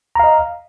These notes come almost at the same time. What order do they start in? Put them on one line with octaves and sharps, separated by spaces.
A#5 F5 D#5